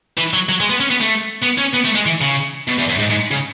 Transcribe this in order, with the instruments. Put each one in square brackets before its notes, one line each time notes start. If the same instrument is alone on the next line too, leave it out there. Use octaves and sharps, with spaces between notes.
[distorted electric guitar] E3
F#3
F#3
G#3
B3
C#4
B3
A3
B3
C#4
B3
A3
G#3
E3
C#3
B2
E2
F#2
G#2
G#2
C#3